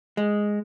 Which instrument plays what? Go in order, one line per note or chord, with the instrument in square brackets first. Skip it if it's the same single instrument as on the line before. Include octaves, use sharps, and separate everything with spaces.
[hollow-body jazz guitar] G#3